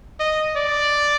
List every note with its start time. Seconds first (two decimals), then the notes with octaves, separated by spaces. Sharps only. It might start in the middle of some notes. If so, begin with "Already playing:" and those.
0.19 D#5
0.56 D5